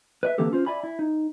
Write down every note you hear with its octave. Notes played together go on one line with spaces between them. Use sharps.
B4 D5 E5
D3 E3 A#3 C4 G4 A4
C#4 F4 C5
D5 E5 G#5 B5
E4
D#4